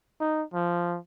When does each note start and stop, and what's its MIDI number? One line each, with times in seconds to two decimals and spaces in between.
0.20 0.43 63
0.54 0.98 53